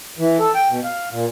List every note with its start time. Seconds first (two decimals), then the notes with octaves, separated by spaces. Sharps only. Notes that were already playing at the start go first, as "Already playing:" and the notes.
0.19 E3
0.39 A4
0.55 G5
0.70 B2
0.84 F5
1.12 A#2